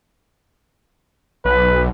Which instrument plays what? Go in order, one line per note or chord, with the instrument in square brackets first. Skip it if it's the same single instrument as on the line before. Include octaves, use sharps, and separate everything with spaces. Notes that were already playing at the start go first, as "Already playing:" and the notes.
[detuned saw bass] B1 [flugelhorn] B4